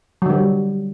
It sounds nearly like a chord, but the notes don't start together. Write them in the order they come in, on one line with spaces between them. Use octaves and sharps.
F#3 D3 G3